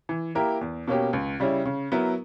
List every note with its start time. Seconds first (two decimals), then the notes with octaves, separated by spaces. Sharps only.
0.09 E3
0.35 A#3 E4 G4 A#4
0.61 E2
0.87 B2 A#3 C#4 G4
1.13 C#2
1.40 C#3 G3 C#4 E4
1.66 C#3
1.92 F#3 B3 E4 A#4